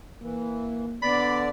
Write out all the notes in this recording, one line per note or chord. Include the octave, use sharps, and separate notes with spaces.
E3 A#3
D3 B3 D5 B5